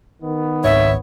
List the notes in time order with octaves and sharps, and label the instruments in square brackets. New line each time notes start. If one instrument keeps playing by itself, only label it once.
[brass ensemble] D#3 B3
[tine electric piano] G#1 C#2 G#2 [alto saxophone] C#5 [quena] E5